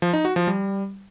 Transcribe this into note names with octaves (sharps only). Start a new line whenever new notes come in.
F3
D#4
F#4
F3
G3